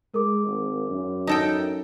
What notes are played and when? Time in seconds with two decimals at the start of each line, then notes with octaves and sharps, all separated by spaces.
0.14 G#3 A#4 D6
0.47 G#1
0.89 F#2
1.27 D#4 A4 G5